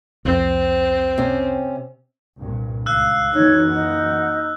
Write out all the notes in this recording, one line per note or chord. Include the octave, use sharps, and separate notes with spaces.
C2 F2 C4
C3 C#4
C2 G2 A#2
C#2 F5 E6 F#6
F#2 E3 A#3 D#4 C#5
D#4 F#5